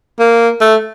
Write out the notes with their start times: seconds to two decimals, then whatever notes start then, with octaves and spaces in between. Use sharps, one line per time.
0.19 A#3
0.61 A3